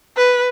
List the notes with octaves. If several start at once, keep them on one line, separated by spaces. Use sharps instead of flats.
B4